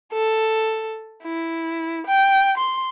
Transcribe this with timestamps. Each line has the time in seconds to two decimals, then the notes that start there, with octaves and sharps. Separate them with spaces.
0.13 A4
1.23 E4
2.07 G5
2.58 C6